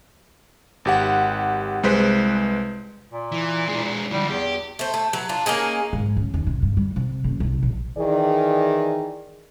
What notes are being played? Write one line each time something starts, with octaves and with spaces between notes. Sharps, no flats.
G#1 G4 F#5
C2 G#3 B4 C5 B6
A#2
E3
G#3 D4
D3 F3 G3
E2 G4
A3 C5
A3
F#3 B4
D4 F4
A#3 C#4 D#4 G#4
G#2
C#3
D#2
C3
G2
G3
C3
F#1
C2
A#1
D#3 E3 G#4 D5